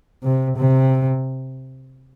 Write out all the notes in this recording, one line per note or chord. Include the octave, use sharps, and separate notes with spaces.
C3
C3